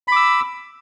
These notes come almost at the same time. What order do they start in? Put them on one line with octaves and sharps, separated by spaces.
B5 D6 E6